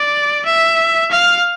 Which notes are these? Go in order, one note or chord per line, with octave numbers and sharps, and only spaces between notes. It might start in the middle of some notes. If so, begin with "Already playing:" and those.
Already playing: D5
E5
F5